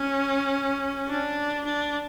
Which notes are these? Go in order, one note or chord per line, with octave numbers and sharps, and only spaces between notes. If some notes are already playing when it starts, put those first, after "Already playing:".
Already playing: C#4
D4
D4